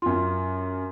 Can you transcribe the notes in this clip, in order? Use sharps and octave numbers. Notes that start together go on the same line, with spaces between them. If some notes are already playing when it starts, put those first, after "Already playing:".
F#2 F4 C6